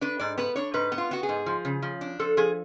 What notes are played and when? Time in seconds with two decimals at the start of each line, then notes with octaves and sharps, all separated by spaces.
0.01 D4 B4
0.19 G#2 D5
0.38 B3 B4
0.56 D4 C#5
0.74 G#2 B4
0.92 B3
0.98 F4
1.11 B3 F#4
1.23 G#4
1.29 G#2
1.46 F3
1.65 C#3
1.82 F3
2.01 D4
2.19 F3 A4
2.37 F3 G#4